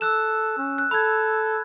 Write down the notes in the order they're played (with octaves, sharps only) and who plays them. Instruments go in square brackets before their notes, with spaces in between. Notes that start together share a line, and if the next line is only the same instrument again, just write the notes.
[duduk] A4 [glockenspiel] E6 F#6 E7
[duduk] C#4
[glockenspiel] F#6
[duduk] A4 [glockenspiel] B5 G#6